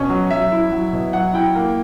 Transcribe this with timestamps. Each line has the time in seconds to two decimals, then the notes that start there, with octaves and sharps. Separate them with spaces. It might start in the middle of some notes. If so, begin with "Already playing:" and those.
Already playing: B2 C#4
0.09 F#3
0.31 F#3 E5
0.52 E4
0.71 F#3
0.93 B2
1.13 F#3 F#5
1.34 E4 G5
1.55 A#3